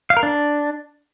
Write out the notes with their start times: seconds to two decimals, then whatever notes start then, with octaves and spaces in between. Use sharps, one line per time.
0.10 F5
0.17 A#4
0.23 D4